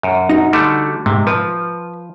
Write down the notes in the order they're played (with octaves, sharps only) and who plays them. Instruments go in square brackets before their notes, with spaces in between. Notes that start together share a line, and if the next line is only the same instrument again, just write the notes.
[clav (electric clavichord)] F#2
[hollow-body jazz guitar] D#4 F#4
[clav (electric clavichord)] D3 G3 A3
[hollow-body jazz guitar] G#2 [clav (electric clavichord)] C3
[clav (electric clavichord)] F3 [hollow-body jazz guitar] B4